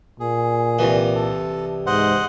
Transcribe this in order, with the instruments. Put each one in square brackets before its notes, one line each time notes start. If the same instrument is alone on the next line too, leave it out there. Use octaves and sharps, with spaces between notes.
[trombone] A#2 [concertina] G#4
[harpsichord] C2 E3
[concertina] A4
[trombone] G#2 [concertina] C5 D#5 F#5